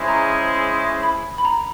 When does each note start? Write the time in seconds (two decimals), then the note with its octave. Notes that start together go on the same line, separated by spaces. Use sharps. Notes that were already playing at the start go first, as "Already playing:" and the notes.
Already playing: G#3 C#4 E4 G#4 C5
0.08 A#5
1.03 B5
1.38 B5
1.45 A#5